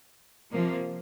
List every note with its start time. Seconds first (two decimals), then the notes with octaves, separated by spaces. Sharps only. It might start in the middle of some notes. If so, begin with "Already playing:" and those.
0.51 C3 F3 A#3